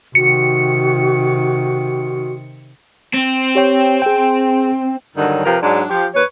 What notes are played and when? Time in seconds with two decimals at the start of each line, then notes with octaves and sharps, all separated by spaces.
0.15 C3 D#3 F#4 C#7
3.14 C4
3.55 G4 C#5 G5
4.02 G#4 G5
5.16 G2 D3 D#3 F#3
5.45 C3 F3 G4 A#4 B4
5.62 G#2 F#3 D4
5.90 F3 G4
6.15 D#2 B4 C#5